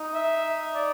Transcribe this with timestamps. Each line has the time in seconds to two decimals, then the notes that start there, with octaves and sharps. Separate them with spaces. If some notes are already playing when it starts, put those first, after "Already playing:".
Already playing: D#4
0.14 E5
0.74 D5